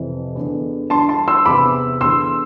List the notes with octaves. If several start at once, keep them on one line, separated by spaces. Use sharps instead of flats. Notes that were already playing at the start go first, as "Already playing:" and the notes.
Already playing: F2 C3 E3
E2 D3
G2 D3 A5 C6
A5 C6
C6 E6
E2 C3 E3 B5 D6
E2 D3 C6 E6